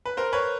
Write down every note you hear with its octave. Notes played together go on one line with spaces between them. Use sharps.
B4
A#4 C5
B4 C#5